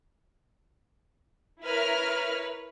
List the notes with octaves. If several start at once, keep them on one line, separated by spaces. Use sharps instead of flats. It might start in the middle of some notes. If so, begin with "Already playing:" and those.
E4 A#4 B4 C#5 F6